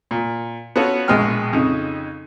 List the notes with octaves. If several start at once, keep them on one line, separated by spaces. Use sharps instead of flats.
A#2
B3 C#4 F4 F#4 A4 C#5
A#1 B2 G#3 B3 G5 F6
F2 C#3 D#4